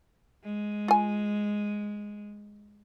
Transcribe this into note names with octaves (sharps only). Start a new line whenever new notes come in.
G#3
F4 G#5